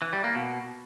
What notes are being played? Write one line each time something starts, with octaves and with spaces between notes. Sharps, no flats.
E3
G3
A#3
B2